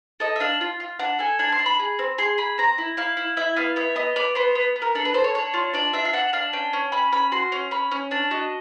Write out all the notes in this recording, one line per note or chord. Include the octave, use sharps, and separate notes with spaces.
A4 D#5
E5
D4 F5
F4
F4
D4 F#5
A4 G#5
D4 G#5
C6
D4
B5
G#4
C4
G#4 C6
G#4 B5
C4 A#5
E4
E4 F5
E4
E4 E5
B3 F5
B3 E5
B3 D#5
B3 D5
B3 C5
B3
B3
A#4
D4 A4
B4
A4 C5
C#5
D4 C#5
F4
D4 D5
D4 E5
F5
D4 F#5
D4 F5
C#4 G5
C#4
C#4 B5
C#4 B5
F#4 C6
C#4
C#4 B5
C#4
D4 A5
F#4 D#5